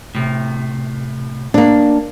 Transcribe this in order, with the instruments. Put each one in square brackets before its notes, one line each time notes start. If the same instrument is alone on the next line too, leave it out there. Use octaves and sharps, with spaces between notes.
[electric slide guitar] A2 C3
[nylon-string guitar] A#3 D4